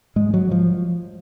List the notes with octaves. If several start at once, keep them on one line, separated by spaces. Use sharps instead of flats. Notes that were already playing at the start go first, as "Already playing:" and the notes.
G#2 G#3
F#3
F3